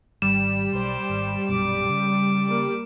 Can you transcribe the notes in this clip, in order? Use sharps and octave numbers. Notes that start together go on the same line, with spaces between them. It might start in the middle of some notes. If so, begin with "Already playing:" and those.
G#1 G3 E7
B1 C5 D5
G#1
A#1 F#2 B2 D6
C#3
A#3 D6